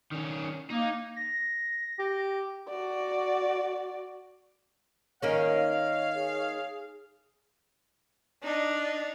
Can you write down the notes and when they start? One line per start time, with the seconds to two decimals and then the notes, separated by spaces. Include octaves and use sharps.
0.12 D#3 C#4
0.70 A#3 D#4
1.16 A#6
1.99 G4
2.68 F#4 D5
5.22 D#3 A#3 C#4 C#5 D#5 F5
6.14 G#4
8.43 D4 D#4